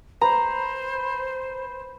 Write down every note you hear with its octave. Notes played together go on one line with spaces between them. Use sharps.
B4 C5 A#5